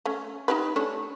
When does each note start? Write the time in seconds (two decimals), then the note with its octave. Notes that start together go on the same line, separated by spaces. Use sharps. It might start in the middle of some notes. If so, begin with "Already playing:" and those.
0.06 A3 C#4
0.48 D#4 G4 B4
0.76 A3 C#4 D4